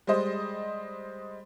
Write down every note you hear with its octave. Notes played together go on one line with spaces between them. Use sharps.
G3 G#3 C5 D#5